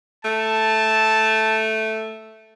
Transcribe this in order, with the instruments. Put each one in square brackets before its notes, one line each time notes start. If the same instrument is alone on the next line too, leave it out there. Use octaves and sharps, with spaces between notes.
[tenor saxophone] A3 [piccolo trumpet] A5